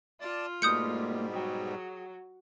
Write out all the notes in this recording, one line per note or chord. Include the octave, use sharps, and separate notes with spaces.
F4 D5 A5
G#2 B2 G3 A3 A#3 D#6 G6 C#7
F#3 G#4 G5